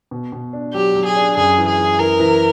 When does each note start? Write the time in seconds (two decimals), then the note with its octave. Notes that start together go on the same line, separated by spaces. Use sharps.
0.11 B2
0.32 B2
0.53 D4
0.74 F#3 G4
0.95 F#3
1.05 G#4
1.16 D4
1.37 F#2 G#4
1.58 E3
1.68 G#4
1.79 E3
1.99 E3 A#4
2.20 E3